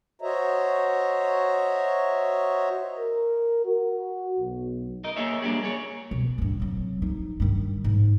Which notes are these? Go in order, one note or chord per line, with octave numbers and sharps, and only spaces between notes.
F#4 C5 C#5 D#5 E5 A#5
A#4
F#4
B1
D#4 A#4 D#5
A#3 D#4 G#4 C#5 E5
G3 A#3 D4 G4 G#4
G#4 C#5
B2
G2 A#2
C2 F#3
F3 D#4
G2 D#3
G#2